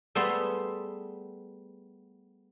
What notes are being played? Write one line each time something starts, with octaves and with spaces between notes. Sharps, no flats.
G3 A3 B3 G#4 E5 C6